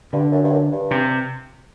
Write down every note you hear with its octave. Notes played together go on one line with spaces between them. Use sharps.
G2 D3
F#2
G2
F#2
G2
C3